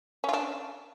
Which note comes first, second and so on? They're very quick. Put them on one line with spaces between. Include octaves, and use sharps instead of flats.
C#4 F4 D4